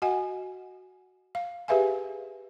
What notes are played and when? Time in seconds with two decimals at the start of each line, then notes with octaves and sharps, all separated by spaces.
0.02 F#4 D#5 F#5 G#5
1.35 F5
1.68 G4 G#4 B4 E5 F5 G#5